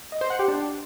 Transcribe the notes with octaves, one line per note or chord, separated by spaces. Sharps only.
D#5
C5
F#5
G4
D4